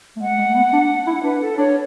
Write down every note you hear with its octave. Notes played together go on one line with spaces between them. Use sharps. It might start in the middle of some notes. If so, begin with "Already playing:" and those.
A3
G#3 F#5
G#3
A3
B3
D4
E4
D4 B4
A4
D4 C#5